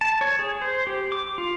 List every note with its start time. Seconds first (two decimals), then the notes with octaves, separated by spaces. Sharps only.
0.01 A5
0.21 C#5
0.39 G#4
0.62 C5
0.87 G4
1.12 D6
1.38 F4